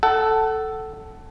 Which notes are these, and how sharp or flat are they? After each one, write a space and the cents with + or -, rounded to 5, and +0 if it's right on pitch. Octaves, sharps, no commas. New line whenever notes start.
A4 +0 F#5 +30